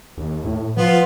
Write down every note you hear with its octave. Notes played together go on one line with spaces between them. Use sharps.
D#2
A2
F3 B3 F4